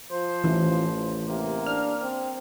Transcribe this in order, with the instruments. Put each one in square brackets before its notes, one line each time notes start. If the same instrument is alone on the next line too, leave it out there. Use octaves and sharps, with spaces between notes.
[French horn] F3 [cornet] C5
[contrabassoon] A1 [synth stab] E3
[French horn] C3 [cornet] A#3
[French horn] D4 [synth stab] F6
[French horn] C4